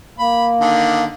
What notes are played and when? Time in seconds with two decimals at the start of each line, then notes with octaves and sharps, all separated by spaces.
0.19 A#3 B5
0.61 D3 D#3